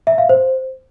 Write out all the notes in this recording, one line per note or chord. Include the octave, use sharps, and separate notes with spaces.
E5
F5
C5